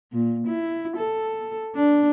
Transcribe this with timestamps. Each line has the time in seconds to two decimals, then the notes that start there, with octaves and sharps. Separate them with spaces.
0.13 A#2
0.47 E4
0.96 A4
1.75 D4